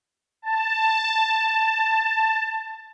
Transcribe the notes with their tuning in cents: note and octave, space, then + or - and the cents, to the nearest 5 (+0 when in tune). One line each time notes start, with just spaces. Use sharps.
A5 +10